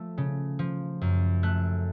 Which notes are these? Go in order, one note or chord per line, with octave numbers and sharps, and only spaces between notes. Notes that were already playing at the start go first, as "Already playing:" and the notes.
Already playing: F3 A3
C#3
F3
F#2
A3 F#6